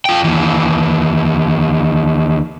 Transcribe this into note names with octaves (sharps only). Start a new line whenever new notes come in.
F4 G5
D#2 E3